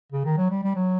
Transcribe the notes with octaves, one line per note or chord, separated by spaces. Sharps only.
C#3
D#3
F#3
G3
G3
F#3